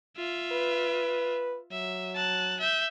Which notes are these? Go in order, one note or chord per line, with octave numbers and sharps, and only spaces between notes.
F4 E5
B4
F#3 E5
A5 F#6
E5 G6